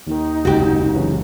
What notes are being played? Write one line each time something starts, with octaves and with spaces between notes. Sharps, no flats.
D#2 D#3 D#4
F#1 C#2 C3 F#4 G4
C#3 E3 F#3